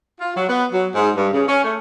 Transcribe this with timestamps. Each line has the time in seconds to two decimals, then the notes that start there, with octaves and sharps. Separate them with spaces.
0.21 F4
0.37 F#3
0.49 B3
0.73 F#3
0.95 G#2
1.16 G2
1.33 C#3
1.48 C#4
1.64 A3